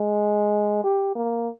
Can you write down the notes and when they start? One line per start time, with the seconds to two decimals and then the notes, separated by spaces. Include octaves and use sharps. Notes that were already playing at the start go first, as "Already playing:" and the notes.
Already playing: G#3
0.84 G4
1.15 A#3